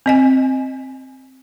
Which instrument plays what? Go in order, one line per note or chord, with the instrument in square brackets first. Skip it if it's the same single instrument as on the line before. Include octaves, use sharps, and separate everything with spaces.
[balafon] C4 D#5 G#5